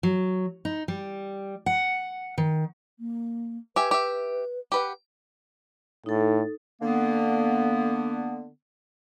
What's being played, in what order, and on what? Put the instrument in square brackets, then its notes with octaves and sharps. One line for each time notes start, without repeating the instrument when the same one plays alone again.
[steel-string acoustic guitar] F#3
D#4
G3
F#5
D#3
[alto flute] A#3
[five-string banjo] G4 E5 G#5 [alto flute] B4
[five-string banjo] G4 E5
G4 B4 F#5
[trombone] A2 [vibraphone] D#4 A4
[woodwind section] D3 A#3 B3